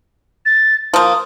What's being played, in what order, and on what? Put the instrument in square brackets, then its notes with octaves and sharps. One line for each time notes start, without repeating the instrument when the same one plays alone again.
[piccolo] A6
[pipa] F3 A#3 [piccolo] D#6